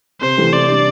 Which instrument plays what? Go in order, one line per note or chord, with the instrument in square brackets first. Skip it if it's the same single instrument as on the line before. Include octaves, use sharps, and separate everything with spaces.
[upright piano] C3 [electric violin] C5
[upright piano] E3 A3 C4 G4
[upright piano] C3 [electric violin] D5
[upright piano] G3 D4